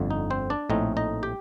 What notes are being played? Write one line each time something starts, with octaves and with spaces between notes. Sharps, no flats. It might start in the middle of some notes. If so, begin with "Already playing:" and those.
Already playing: G1 F2 D3
D#4
C4 C5
D4 D5
A#1 A2 A3 C4 D#4 D#5
D#4 D#5
G4 G5